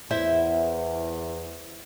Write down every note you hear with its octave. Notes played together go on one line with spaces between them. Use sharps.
E2 E4 C5 E5